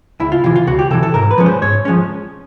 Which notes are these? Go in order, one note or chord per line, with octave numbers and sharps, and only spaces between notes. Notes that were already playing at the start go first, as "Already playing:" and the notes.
C#2 E4
F4
C3 E3 F4
F4
C#2 F#4
G4
C3 E3 A4
A4
G#2 A#4
B4
F3 G#3 C#4
C5
G#2 C#5
F3 G#3 C#4